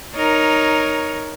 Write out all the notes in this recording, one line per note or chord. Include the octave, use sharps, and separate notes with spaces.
D#4 A#4 C#5